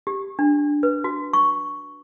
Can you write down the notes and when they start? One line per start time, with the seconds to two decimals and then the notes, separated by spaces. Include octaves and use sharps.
0.07 G4
0.39 D4
0.83 B4
1.04 F#4
1.33 C#6